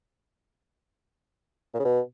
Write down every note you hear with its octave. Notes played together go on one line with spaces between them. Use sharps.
A#2
C#3
B2